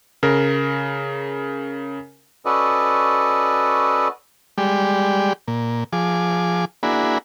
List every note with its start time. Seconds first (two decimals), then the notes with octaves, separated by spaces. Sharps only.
0.23 C#3 A#4
2.46 C#4 F#4 A4 B4 D5 D#5
4.58 G3 G#3 G4 D5
5.48 A#2
5.93 F3 G#4 D6
6.83 A#3 D4 E4 F#4 G#4 B5